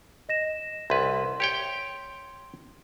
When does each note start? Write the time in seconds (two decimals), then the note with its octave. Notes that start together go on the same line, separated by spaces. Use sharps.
0.29 D#5 A#6 E7
0.90 C2 B4 C6
1.40 G4 C#5 G5